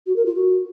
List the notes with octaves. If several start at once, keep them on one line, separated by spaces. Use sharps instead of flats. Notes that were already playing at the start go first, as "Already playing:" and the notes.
F#4
A#4
F4
F#4